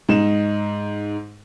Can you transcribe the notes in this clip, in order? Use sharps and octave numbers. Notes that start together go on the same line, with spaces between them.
G#2 D#4 E7